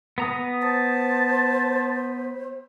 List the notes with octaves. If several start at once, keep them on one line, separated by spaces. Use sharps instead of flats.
B3 A#5 D#6
C5 A5